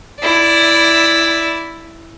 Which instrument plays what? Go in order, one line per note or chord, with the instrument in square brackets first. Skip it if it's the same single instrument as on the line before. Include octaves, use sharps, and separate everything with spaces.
[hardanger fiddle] E4 D5